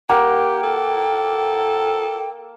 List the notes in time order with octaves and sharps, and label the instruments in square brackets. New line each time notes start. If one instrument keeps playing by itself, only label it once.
[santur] A#3 [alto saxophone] G4 [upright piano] F#5 [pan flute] G5
[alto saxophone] A4